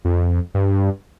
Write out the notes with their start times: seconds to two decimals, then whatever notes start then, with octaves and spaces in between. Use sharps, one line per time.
0.05 F2
0.54 G2